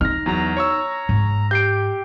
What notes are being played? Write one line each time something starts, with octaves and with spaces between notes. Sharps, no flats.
D#4 F6 A#6
E2 F#3 A#5 A#6
C#5 C#6 E6
G#2
G4 G6 C7 D7